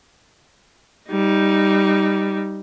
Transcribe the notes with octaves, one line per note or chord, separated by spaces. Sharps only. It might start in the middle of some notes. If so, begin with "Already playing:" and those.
G3 D#4